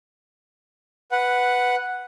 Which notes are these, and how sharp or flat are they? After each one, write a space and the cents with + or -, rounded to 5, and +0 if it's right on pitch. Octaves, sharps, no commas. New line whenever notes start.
B4 +0 F#5 +0